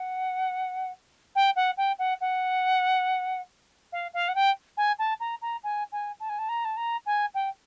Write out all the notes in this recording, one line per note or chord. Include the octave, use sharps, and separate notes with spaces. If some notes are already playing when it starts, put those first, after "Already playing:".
Already playing: F#5
G5
F#5
G5
F#5
F#5
F5
F5
F#5
G5
G#5
A5
A#5
A#5
G#5
G#5
A5
G#5
A5
A#5
A5
A#5
G#5
G5